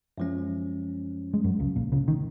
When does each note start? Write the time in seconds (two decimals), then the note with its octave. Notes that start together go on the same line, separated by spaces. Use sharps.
0.18 F#2 F3 G#3 C#4
1.34 G#3
1.44 F#2 F#3
1.60 C#2 C#3
1.76 A#1 A#2
1.92 C#2 C#3
2.08 D#3